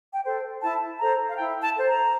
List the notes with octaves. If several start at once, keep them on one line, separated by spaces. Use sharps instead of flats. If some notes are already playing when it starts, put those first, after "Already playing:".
G5
A4 C5
E4 A5
A4 C5 A#5
F5
E4 G5
A5
A4 C5
A#5